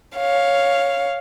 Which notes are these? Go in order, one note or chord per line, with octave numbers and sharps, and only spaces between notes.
C#5 F5